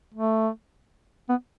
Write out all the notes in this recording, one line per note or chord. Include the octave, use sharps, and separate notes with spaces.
A3
B3